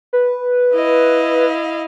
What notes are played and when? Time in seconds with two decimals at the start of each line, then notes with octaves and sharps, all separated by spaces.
0.13 B4
0.74 E4 D#5 F5